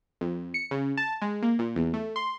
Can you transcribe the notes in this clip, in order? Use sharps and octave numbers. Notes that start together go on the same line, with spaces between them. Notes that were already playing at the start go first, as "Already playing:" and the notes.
F2
C#7
C#3
A5
G#3
A#3
A#2
E2
A3
C6